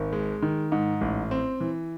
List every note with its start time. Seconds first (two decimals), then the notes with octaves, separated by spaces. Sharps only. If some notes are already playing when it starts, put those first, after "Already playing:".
Already playing: G#1
0.13 G#3
0.42 D#3
0.72 G#2
1.01 A1
1.31 C4
1.61 E3